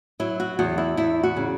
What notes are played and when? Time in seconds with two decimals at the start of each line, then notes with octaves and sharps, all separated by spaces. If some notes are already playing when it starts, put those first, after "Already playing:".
0.20 F#3 E4
0.40 F#4
0.59 E2 F#4
0.78 E4
0.97 E2 E4
1.23 F#4
1.37 C#3